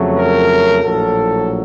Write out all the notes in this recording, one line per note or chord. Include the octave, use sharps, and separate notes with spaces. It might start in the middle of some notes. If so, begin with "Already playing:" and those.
Already playing: F2 C#3 F#3 A3
A#4
A#1 A2 F#3 A4